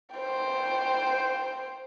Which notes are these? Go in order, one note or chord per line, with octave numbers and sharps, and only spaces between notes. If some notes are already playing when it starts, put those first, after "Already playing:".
C5 G5